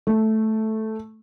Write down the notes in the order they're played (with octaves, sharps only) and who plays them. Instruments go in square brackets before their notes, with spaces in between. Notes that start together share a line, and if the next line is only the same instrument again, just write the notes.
[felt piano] A3